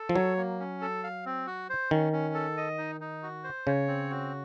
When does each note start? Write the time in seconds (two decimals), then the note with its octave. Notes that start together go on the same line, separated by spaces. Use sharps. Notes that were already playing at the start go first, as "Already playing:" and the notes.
Already playing: A4
0.09 F3
0.15 F#3 C#5
0.37 A#3
0.60 C#4
0.81 A4
1.04 F5
1.25 C4
1.46 F#4
1.70 C5
1.91 D#3 C#4
2.13 C#4
2.34 A4
2.57 D#5
2.78 D#4
3.01 D#4
3.23 F#4
3.44 C5
3.67 C#3 C#5
3.88 C4
4.11 F#4